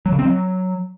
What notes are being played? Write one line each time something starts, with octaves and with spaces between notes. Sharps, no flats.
F#3
C#3
C4
F#3